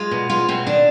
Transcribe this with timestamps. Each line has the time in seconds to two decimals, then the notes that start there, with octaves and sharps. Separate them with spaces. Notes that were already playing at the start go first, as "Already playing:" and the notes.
Already playing: G#3 F4
0.11 B2
0.30 G#3 F4
0.48 B2 C4
0.66 D#3 D4